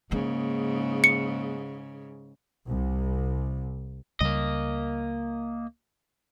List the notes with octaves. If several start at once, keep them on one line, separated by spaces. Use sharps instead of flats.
G#2 C#3 A#3 D#4
C#7
C2
C#2 C#3 G3 A#3 D#5